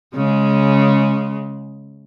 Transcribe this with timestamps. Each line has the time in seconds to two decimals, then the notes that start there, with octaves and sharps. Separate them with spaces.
0.14 C#3 G#3